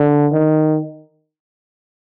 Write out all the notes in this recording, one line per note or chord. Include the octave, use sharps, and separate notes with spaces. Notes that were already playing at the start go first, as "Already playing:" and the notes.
Already playing: D3
D#3